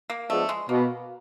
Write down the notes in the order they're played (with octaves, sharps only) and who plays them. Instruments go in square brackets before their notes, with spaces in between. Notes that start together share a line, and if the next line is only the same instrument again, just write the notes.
[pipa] A#3
[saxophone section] F3 G#3 B3 D4 [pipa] A3
[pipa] G#3
[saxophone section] B2 [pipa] A#3